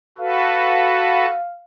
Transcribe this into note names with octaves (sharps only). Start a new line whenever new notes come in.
F#4 A4 B4 F5